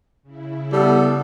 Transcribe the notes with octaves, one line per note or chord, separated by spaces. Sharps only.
C#3 E4
G3 B3 A4